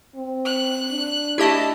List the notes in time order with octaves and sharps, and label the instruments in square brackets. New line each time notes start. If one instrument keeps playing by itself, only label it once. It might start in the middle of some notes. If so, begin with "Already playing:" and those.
[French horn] C4
[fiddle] F#6
[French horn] D4
[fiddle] A3 A5 [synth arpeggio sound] E4 G4 D#5